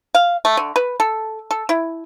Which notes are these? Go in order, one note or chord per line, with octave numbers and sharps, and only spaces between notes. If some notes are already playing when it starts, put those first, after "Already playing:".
F5
A3
D3
B4
A4
A4
E4